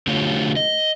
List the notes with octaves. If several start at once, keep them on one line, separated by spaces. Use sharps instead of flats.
D3 F#3 A3 F4 G4 C#5
D#5